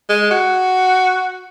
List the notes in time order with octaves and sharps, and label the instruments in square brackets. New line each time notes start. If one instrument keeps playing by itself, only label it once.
[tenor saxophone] G#3
F#4